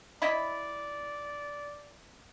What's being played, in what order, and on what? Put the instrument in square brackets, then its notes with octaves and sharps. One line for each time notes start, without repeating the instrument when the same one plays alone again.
[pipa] E4 D#5 B5 [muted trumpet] D5